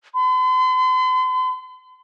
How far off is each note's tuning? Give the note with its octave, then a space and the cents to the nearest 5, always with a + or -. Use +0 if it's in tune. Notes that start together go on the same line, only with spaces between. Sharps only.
C6 -45